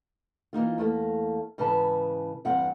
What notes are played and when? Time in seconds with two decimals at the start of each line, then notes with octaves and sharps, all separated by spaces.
0.53 E3 A#3 D#4 F4
0.78 E2 A3 A#3
1.58 G#2 C#3 E3 B4 A5
2.45 E2 G2 C4 F#5